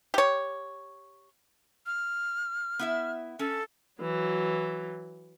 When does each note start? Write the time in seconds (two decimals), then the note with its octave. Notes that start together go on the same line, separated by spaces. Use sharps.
0.14 G4 C#5
1.86 F6
2.79 B3 E4 E5
3.39 C#4 A4
4.02 E3 F#3